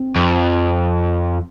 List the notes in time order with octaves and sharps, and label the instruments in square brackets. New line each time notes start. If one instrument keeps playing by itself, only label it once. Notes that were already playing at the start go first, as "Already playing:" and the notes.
Already playing: [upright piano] C4
[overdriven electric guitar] F2